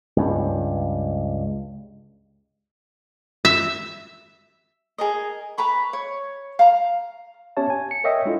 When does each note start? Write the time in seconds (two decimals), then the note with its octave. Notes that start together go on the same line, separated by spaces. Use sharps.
0.16 C#2 G2
3.45 E5
4.98 G#4 A#4 D#5
5.58 B4 A#5 B5 C#6
5.93 C#5
6.59 F5 A#5
7.57 B3 C#4 G4 C#5 E5 A5
7.70 G#5
7.91 C#7
8.04 A#4 C#5 D#5 E5 G5
8.25 G#3 D4 E4 F4 A4